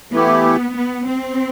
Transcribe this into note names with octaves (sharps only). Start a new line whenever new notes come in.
E3 A3 B3 E4 G4
B3
C4